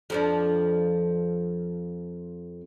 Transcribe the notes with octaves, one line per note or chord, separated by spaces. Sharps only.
F2 F3 D4